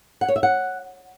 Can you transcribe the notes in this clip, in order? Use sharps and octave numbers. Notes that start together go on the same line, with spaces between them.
F#5
C#5
E5
F#5